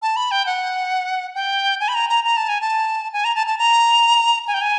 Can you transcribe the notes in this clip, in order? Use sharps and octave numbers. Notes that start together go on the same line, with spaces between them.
A5
B5
G5
F#5
G5
G#5
B5
A#5
A#5
A#5
A5
G#5
A5
G#5
A#5
A5
A5
A#5
G#5
G5
G#5